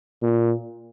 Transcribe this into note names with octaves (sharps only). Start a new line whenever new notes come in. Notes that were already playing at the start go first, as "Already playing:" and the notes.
A#2